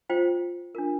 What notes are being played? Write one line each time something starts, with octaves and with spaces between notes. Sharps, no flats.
F4 C5 G5
D4 F4 A#4